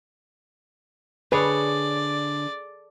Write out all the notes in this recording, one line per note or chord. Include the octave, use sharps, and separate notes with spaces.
D3 G#4 B4 C#5 D5